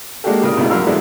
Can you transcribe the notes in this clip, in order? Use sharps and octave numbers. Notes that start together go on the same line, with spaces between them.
G#3 A#3 D4 F#4 G4 A4
A1 C#3 F4 A#4 D#6
G#1 C#2 B2 E4
F#2 F#3 A#4 F5 E6
D3 E3 G#3 B3 D4 E4